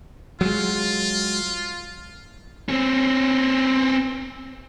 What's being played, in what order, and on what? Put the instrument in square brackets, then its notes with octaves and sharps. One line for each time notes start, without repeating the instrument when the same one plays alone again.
[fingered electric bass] F#3 G#3 [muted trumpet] F4
[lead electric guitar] C4 C#4